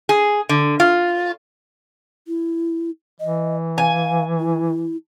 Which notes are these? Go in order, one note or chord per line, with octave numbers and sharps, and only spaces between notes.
G#4
D3
F4
E4
E3 D#5
F5 G#5
E4